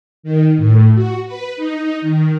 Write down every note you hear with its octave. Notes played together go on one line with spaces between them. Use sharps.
D#3
A2
F#4
B4
D#4
D#3